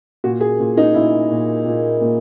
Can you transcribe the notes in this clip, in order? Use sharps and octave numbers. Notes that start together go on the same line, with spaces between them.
A#2 F#4
G#4
A#2
D#4
A#2 E4
A#2
A#2
A#2